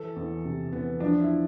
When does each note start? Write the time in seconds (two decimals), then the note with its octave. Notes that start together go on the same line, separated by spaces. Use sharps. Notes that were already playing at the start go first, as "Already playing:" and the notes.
Already playing: E3 A4
0.16 E2
0.45 C3
0.73 E2 B3
1.00 F3 D4
1.20 E4